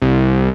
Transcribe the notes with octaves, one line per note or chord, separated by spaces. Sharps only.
C2